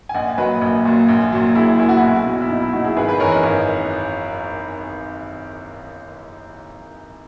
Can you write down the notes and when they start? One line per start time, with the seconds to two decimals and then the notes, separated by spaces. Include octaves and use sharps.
0.09 G#5
0.14 A#1 D#5 F#5
0.38 A#2 F#3 B4 D#5
0.61 A#1
0.85 A#2 F#3
1.09 A#1
1.32 A#2 F#3
1.55 A#1 E4 G#4
1.79 A#2 F#3 E4
1.89 F#4
1.98 B1 E4
2.26 B2 F#3
2.42 E4
2.50 B1 D#4
2.61 E4
2.73 B2 F#3 D#4 F#4
2.84 E4 G#4
2.97 G#1 G#4 B4
3.08 G#4 B4
3.15 D#5
3.20 F#2 E3 A#4 C#5
3.32 B4 D#5
3.43 G#1